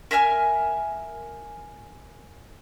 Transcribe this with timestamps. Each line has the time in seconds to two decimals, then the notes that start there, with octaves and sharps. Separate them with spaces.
0.11 A#4 E5 G#5 F6